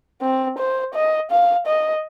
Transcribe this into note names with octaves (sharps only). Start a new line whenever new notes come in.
C4
C5
D#5
F5
D#5